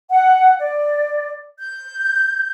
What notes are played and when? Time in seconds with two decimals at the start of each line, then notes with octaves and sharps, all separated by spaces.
0.10 F#5
0.59 D5
1.59 G6